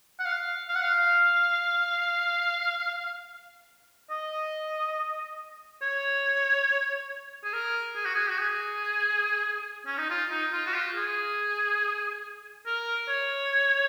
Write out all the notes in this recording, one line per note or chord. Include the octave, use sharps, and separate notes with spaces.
F#5
F5
F5
F#5
F5
D#5
C#5
G#4
A#4
G#4
F#4
G#4
F#4
G#4
C#4
D#4
F4
D#4
F4
F#4
F4
G#4
A#4
C#5